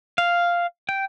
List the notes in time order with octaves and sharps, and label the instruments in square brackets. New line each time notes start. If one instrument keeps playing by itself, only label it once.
[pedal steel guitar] F5
G5